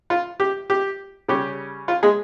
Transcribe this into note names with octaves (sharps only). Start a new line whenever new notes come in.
F4
G4
G4
C#3 G3 C#4 G4
F4
G#3 G#4